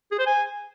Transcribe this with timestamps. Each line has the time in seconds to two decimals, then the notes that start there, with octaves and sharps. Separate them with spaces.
0.12 G#4
0.19 C5
0.26 G#5